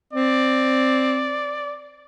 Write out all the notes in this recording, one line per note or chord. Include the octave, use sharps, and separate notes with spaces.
C4 D5